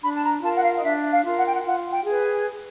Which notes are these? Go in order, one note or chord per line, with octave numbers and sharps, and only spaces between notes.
D4 B5
A5
A#5
F4 A#4 A5
F#5
F5
D#5
D4 E5
F5
F4 A#4
F#5
G5
F#5
F4 F#5
G5
G#4 B4
G#5